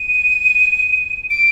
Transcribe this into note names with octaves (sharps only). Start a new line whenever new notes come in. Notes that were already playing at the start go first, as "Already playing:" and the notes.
Already playing: D#7
D7